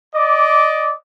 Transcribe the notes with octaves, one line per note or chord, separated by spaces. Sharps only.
D5 D#5 D6